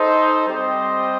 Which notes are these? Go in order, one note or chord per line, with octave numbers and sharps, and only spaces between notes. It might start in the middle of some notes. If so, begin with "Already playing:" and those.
Already playing: D#4 A4 C5 D#5
G3 C4 G4 C5 D#5